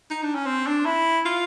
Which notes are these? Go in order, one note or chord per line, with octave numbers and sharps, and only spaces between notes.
D#4
D4
C#4
C4
D4
E4
F4